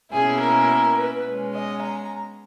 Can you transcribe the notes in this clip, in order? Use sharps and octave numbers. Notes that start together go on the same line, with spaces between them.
B2 A#3 C#4 E4 G#4
A#4
B4
B2 G#3 C#4
D#5
A#5